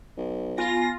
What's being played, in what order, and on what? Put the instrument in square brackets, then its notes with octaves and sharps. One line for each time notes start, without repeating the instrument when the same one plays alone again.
[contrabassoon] B1
[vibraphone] B3 G#5 [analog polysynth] F4 [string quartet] A#6